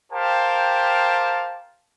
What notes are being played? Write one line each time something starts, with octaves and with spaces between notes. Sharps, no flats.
G4 A#4 C5 F5 G5 A5